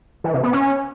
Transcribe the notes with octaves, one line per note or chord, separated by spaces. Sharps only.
E3
C3
B3
C#4